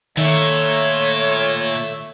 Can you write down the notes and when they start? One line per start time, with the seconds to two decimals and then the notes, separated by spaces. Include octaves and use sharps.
0.17 A#2 D#3 A3 C#5 E6